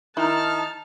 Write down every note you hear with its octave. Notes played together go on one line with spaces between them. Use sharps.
D#3 D#4 E4 A5 F6